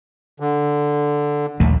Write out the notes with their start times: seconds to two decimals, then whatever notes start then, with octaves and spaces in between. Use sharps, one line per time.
0.40 D3
1.60 A#1 D#2 A3